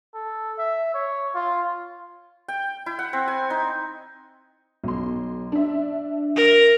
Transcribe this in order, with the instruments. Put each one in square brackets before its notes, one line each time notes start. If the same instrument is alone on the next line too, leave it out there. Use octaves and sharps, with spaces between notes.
[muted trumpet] A4
E5
C#5
F4
[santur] G5
E4
F#5
C4
G#5
D#4
[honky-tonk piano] B1 C6
D4 E5
[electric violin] A#4